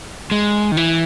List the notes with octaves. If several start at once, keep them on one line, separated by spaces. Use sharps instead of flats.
G#3
D#3
E3